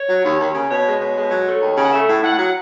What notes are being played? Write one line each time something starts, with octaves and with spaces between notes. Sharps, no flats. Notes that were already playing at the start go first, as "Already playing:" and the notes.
Already playing: C#5
F#3
D#2
D#2
C#3
B2 C#5
G#3
B2 C#5
G#3
F#3
A3
D#2
C#3
F#5
A3 E5
A2
A2 F#5
F#3